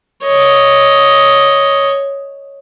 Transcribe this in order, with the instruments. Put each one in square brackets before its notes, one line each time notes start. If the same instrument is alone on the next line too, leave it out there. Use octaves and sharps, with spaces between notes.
[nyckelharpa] C#5 D#5